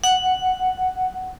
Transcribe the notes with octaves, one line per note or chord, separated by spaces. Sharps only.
F#5